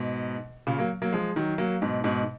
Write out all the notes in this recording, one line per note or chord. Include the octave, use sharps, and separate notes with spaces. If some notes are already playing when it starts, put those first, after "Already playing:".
Already playing: G#2 B2
A#2 C#3
F#3 A#3
F#3 A#3
F3 G#3
D#3 F#3
F#3 A#3
G#2 B2
G#2 B2